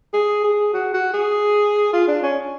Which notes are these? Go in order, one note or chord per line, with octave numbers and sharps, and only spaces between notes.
G#4
G#4
F#4
F#4
G#4
F4
D4
C#4